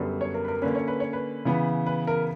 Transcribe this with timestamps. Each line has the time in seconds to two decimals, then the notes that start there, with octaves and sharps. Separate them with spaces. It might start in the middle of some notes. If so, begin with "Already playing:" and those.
Already playing: F#2 D3 G3 B3
0.21 C#5
0.34 A#4
0.44 B4
0.48 A#4
0.62 D3 A#3 C#4 B4
0.75 C#5
0.88 B4
1.00 C#5
1.13 B4
1.45 C#3 E3 B3
1.86 B4
2.07 A#4